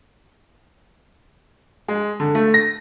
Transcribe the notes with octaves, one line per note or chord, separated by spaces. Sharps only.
G#3
D3
A3
A#6